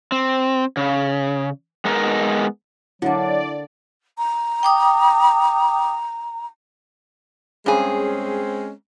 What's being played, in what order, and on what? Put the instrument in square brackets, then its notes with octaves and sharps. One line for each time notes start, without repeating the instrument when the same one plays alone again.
[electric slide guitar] C4
C#3
G#3 B3 D#4 A#4
[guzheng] D3 A#3 [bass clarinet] F#3 [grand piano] E4 [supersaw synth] D5
[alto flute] A#5
[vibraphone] G5 D6 D#6
[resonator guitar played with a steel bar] G2 G#4 [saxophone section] G#3 C4 C#4